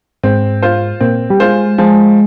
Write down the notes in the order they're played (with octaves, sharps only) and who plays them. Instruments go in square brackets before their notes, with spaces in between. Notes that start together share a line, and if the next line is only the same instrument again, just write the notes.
[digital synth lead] G#2 [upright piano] C4
[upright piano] F4 C5
[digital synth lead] A#2 [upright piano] C4
[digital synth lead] G3
[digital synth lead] G#3 [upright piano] F4 C5
[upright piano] F3 [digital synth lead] G#3